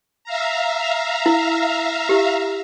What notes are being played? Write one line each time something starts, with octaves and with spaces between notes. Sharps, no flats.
E5 F5 A#5
E4
E4 G4